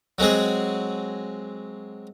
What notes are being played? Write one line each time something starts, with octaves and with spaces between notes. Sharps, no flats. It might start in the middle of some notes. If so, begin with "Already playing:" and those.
F#3 G#3 C4 G#4